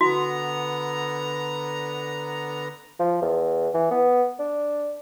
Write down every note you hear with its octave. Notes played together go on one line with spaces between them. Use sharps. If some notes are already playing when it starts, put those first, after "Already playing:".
D3 B3 F#4 A#5
F3
E2
E3
B3
D4